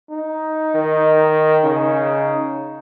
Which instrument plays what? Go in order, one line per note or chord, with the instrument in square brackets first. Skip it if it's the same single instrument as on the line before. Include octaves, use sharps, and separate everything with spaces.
[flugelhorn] D#4
[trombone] D#3
[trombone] C#3 [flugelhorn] D#4